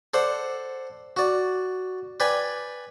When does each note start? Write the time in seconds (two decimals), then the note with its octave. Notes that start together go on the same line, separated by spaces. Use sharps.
0.14 A4 C5 D5 F#5
1.17 F#4 D5
2.20 B4 D5 G5 G#5